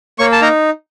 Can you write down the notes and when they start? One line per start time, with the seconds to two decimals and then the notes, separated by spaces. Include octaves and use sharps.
0.19 A#3 C#5 C#6
0.32 A5
0.41 D#4 A#4 A#5